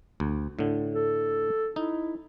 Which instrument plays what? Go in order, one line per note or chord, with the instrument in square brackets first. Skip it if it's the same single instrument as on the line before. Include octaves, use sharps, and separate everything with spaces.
[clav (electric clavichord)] D2
A2 D3
[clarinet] A4
[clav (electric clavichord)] D#4 [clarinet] E4